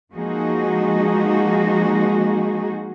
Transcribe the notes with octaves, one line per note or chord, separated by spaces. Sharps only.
F3 G#3 A#3 D#4 F#4 G#4